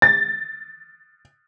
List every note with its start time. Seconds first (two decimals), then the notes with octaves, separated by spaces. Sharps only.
0.02 A6